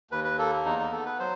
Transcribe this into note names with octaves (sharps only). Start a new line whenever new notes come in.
D#2 B4
B4
A#3 A4
E2 D#4
D#4
B3 A4
B4
F#3 C5